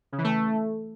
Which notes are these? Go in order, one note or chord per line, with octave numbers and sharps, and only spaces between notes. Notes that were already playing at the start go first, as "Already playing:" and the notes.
C#3
E3
A3